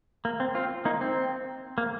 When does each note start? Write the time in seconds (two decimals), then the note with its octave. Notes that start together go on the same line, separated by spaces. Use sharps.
0.25 A#3
0.40 C4
0.55 C4 F4
0.85 A#3 D#4
1.01 C4
1.78 A#3